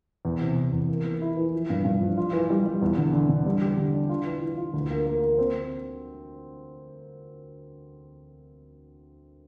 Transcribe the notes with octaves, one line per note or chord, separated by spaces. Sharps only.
E2
C3
E2
E2
A#3
E3
E4
E3
F3
G2
G2
F3
F4
E3
G3
G3
E2
D3
D3
D3
G3
G4
D3
D4
F4
E3
E3
F4
D2
A#3
A#3
A#3
C4